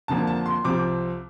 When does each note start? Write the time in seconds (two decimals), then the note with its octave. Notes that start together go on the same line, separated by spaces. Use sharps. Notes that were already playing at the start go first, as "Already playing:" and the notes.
0.08 F2 D3 F3 A#3 A5
0.27 A5
0.46 C6
0.64 C2 C3 F3 C4 D6